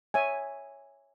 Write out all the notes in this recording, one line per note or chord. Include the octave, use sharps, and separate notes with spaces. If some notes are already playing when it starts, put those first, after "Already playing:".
C#5 E5 G#5